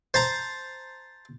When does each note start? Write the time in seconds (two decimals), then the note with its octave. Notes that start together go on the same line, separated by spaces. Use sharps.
0.14 C5 A5 A#5